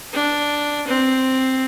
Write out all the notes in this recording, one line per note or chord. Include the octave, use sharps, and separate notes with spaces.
D4
C4